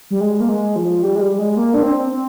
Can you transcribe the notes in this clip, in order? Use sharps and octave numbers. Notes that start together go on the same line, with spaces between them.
G3
G#3
A#3
G#3
F3
G3
G#3
G3
G#3
A#3
D4
C4
C4